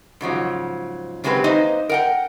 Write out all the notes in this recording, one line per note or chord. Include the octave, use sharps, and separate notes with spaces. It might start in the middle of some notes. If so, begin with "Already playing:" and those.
G#2 C#3 F3 F#3
C#3 F#3 G#3 C4 G4 B4
A#3 D#4 B4 C5 D#5
A#4 F#5 G5